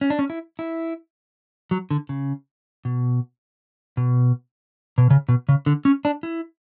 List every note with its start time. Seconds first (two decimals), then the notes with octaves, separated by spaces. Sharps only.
0.01 C#4
0.10 D4
0.19 C#4
0.30 E4
0.59 E4
1.71 F#3
1.91 D3
2.09 C#3
2.85 B2
3.97 B2
4.98 B2
5.10 C#3
5.29 B2
5.49 C#3
5.66 D3
5.85 C#4
6.05 D4
6.23 E4